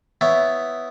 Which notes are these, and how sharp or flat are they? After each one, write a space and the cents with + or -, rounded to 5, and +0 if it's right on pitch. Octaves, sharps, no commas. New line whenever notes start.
B3 +10 E4 +0 C#5 +0